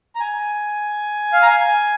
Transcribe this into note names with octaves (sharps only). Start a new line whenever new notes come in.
A#5
G#5
F5
A#5
G#5
G#5